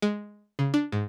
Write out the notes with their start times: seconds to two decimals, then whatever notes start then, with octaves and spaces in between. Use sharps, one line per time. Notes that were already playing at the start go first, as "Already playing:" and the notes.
0.02 G#3
0.59 C#3
0.74 D4
0.92 G#2